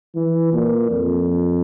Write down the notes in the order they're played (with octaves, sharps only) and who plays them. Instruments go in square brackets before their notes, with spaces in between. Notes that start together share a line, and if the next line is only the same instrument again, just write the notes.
[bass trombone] E3
A#2
F2